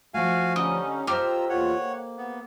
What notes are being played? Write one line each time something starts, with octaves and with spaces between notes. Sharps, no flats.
F3 A3 F#4 F5 G#5
D3 G3 C#4 D#4 D#5
F4 G4 A4 C5 D#5 A#5 E6 F6
E2 A#2 F4 C#5 F#5
A#3
B3